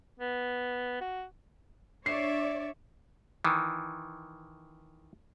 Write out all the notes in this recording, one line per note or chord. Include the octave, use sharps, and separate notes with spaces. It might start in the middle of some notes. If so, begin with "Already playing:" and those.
B3
F#4
D4 C#5 D5 E5 C7
D#3 E3